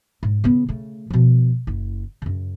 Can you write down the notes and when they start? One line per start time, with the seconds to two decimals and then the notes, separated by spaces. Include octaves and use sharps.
0.23 G#2
0.44 C#3 B3
0.69 C#3 A3
1.10 B2 F3
1.67 F#1 E4
2.22 F#2 C#3